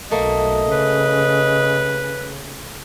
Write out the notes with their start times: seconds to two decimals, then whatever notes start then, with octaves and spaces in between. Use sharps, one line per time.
0.11 B1 A3 A#3 D#5
0.72 C#3 B4